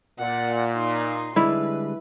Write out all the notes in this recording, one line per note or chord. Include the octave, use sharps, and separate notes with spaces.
A#2 D5 F#5
D#4 C6
D3 G3 G#3 E4 B4